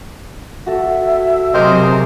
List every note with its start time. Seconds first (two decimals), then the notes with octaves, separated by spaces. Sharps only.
0.66 F#4 A4 E5
1.54 C3 F#3 G4 G#4 A#4 C5 D#5